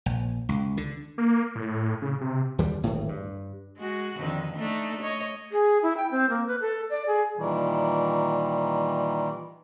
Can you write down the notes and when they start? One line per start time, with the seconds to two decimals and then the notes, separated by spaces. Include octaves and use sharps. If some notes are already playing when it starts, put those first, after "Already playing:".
0.06 A#1
0.49 C#2
0.77 D3
1.18 A#3
1.56 A2
2.02 C#3
2.21 C3
2.58 D#2 D3 G3
2.84 D1 G#1 A2
3.09 G2
3.78 G#3 F#4
4.18 F2 D3 D#3
4.56 A3 D4 D#4
5.01 C#5 D#5
5.52 G#4
5.83 E4
5.97 G5
6.11 C4
6.30 A#3
6.47 B4
6.61 A4
6.90 D5
7.07 G#4
7.37 A#2 D#3 E3 G3